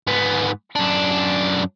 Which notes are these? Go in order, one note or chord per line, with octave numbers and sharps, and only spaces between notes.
G#2 B3
F#2 D4